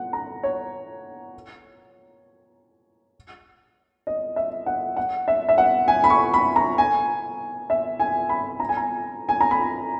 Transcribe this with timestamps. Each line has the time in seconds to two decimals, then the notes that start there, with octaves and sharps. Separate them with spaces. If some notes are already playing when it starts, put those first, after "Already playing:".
Already playing: F#5
0.13 A#5
0.43 C#5
4.07 D#5
4.36 E5
4.66 F#5
4.97 F#5
5.28 E5
5.49 E5
5.58 F#5
5.88 G#5
6.04 B5
6.10 C#6
6.34 B5
6.56 A#5
6.78 G#5
7.70 E5
8.00 G#5
8.29 B5
8.60 A#5
8.69 G#5
8.77 A#5
9.29 G#5
9.41 A#5
9.51 B5